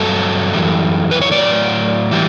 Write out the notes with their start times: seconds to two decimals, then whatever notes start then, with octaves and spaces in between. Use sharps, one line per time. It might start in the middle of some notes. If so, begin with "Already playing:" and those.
Already playing: G2 F#3 A4
0.54 F#2 E3 G3
1.11 B4
1.21 C#5
1.31 A2 F#3 D5
2.11 E3 G3